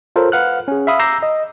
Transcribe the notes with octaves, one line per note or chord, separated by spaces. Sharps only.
F4 A4 A#4 C5 C#5
B4 F5 F#5 F6 F#6
C#4 G#4
E5 F5 B5 D#6
A#5 D6 E6 G6 A#6 C7
D#5